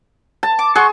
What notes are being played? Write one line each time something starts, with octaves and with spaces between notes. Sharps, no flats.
A5
D6
F#4 G#4 C6 C#6